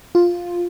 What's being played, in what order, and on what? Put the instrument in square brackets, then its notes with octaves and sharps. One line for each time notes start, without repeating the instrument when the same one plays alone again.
[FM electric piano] F4